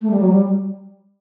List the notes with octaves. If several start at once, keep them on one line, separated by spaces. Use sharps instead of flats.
A3
G3
F#3
G3